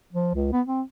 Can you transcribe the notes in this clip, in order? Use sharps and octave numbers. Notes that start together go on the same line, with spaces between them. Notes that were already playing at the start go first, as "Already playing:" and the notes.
F3
C#2
B3
C4